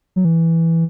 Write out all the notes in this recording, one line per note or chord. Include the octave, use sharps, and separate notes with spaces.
F#3
E3